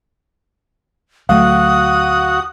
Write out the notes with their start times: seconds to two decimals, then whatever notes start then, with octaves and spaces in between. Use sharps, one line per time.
1.29 D2 F#3 A3 F#4 F5 D#6